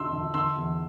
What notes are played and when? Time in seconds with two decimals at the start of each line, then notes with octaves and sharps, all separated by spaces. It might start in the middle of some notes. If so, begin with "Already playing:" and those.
Already playing: D3 G3 D4 C6 E6
0.13 D3
0.34 D3 C6 E6
0.57 E2